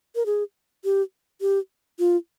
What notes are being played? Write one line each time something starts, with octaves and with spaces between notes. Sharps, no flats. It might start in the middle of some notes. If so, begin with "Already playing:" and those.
A#4
G#4
G4
G4
F4